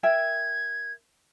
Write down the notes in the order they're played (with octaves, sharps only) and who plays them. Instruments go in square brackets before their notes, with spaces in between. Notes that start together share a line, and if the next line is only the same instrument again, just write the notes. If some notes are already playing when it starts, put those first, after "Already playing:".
[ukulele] A#4 E5 G5 [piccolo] G#6